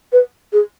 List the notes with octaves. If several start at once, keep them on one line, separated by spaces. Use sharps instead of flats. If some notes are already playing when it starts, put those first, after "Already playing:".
B4
G#4